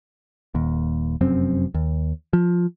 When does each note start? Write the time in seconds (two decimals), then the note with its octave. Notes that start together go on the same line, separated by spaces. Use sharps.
0.55 D#1 D#2
1.21 F1 F#2 C4
1.74 D#2
2.33 F3